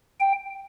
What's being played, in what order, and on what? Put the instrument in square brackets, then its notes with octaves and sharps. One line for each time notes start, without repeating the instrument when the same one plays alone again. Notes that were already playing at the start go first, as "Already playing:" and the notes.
[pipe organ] G5